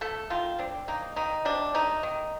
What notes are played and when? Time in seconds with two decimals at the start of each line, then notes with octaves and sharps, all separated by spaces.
0.01 A3 A4
0.30 D#3 F4
0.58 C4 D4
0.88 A#3 D#4
1.16 D#3 D#4
1.45 C3 D4
1.74 A3 D#4
2.03 D#3